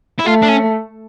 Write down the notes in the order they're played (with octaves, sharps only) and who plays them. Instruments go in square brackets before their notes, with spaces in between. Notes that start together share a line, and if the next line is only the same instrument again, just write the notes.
[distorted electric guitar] E4
[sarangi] A3 [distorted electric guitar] F4
[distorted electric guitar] D4
C#4